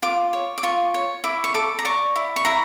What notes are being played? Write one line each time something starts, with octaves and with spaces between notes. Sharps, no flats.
F4 D6
C#5
D6
F4 C#6
C#5
E4 D6
C#6
A4 D6
A#5
D5 C#6
E4
C#6
E4 A#5